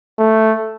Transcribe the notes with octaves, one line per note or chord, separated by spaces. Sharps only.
A3